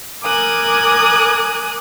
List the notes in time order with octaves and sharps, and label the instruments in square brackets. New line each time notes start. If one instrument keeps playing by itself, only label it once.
[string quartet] A#4 G#5 D6 D#6 F#6